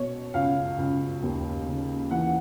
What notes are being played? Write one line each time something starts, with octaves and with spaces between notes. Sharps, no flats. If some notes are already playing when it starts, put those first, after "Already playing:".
Already playing: B2 C#5
C#2 F5
C#2
D#2
C#3
E3 F#5